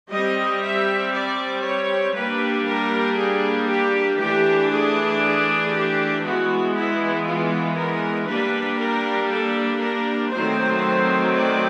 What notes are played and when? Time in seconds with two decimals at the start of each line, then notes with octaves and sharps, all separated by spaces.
0.11 G3 C4 D#5
0.62 E5
1.13 D5
1.64 C#5
2.15 G3 A#3 D4 B4
2.66 A#4
3.18 G#4
3.68 G4
4.19 E3 A3 D4 G4
4.71 G#4
5.22 G#4
5.73 G4
6.23 E3 G#3 B3 F#4
6.75 E4
7.26 F4
7.77 A#4
8.28 G3 A#3 D4 B4
8.79 A#4
9.30 A4
9.81 A#4
10.32 D#3 F#3 A3 C4 C5
11.34 D5